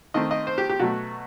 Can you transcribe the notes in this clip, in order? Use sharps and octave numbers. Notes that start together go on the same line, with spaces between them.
D#3 A3 C4 D#5
D#5
C5
G4
G4
B2 F#3 A3 F#4